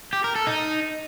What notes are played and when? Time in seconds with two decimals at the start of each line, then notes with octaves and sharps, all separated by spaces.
0.13 G4
0.24 A#4
0.35 A4
0.47 D#4